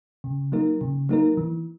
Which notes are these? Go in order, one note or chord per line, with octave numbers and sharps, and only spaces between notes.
C#3
F#3 A#3 D#4 A#4
C#3
F#3 A#3 D#4 A#4
E3